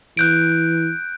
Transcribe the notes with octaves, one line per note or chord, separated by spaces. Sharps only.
E3 F#6 G6 D7